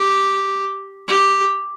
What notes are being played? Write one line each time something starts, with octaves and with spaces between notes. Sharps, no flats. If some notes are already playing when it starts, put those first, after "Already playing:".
Already playing: G4
G4